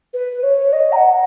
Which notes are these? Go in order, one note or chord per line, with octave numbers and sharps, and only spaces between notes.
B4
C#5
D#5
A#5
F#5